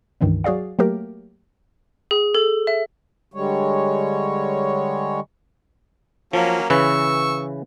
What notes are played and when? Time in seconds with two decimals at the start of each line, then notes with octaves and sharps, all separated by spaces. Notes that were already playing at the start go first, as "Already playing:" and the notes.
0.21 C#2 G2 D#3 E3 F#3
0.44 F#3 F#4 G#4 D5 F5
0.79 F#3 A3 A#3 G4 A#4
2.11 G#4
2.35 A4
2.67 E5
3.34 D3 G3 G#3 C#5
6.33 F3 F#3 A#3 C#4
6.70 C#3 E3 B4 C#6 E6